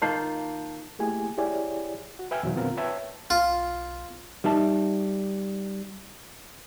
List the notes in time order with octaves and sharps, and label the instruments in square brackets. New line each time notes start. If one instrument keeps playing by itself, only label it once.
[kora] D#3 A#3 F4 [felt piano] A5 G6 C7
[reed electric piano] A3 A#3 E4 G4 G#4 G#5
E4 G4 G#4 C#5 D5 G#5
F#4
B4 E5 G5 G#5 E6 F6
E2 B2 D#3 F#3
A#2 D3 B3 C4 F4 A#4
B4 C#5 E5 G5 A5
[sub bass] B1 [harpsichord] F4
[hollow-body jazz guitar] G3 D#4 E5 A5